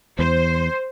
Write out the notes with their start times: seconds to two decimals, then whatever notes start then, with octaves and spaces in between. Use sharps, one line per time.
0.19 E2 C5